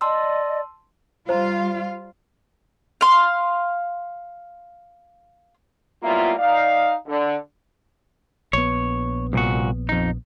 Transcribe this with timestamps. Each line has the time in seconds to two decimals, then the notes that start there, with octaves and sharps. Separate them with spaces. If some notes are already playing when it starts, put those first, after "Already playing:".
0.01 D5 D#5 A5 C6 E6
1.29 G3 F4 C5 F5 A#5
3.01 F5 C6
6.03 F#3 G3 A#3 B3 E4 F4
6.38 D#4 D5 F5
7.07 D3
8.53 A#1 B3 C#5
9.33 C2 A#2 F#4
9.89 F2 D#4